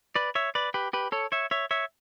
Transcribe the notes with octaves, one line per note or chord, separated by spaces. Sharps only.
B4 D5
C#5 E5
B4 D5
G4 B4
G4 B4
A4 C#5
C#5 E5
C#5 E5
C#5 E5